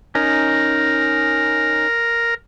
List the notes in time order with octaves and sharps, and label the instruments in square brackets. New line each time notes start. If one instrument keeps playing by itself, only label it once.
[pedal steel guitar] C#4 D#4 [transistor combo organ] A#4